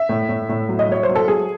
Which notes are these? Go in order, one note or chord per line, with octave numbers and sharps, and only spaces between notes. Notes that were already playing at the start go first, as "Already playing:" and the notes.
Already playing: E5
A2
A2
A2
F#3
D#5
F#3 C#5
C5
F#3
A4
F#3 G#4